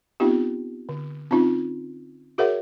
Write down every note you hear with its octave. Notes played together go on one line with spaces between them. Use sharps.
B3 C4 D#4 F4 G4
D3
C4 C#4 D#4 F4
F#4 G#4 A#4 C#5 E5 F#5